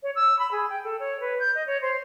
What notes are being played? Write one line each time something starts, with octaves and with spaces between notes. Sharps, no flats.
C#5
E6
B5
G#4
G5
A4
C#5
B4
G6
D#5
C#5
C5